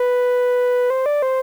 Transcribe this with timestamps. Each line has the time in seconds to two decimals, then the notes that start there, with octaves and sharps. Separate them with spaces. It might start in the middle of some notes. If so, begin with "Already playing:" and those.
Already playing: B4
0.90 C5
1.06 D5
1.22 C5